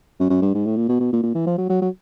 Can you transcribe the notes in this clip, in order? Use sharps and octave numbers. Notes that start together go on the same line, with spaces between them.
F#2
F#2
G2
G#2
A2
A#2
B2
B2
A#2
A#2
E3
F3
F#3
F#3
F#3